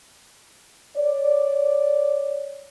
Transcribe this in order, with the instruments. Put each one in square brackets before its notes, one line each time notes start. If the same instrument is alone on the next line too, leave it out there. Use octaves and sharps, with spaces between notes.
[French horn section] C#5 D5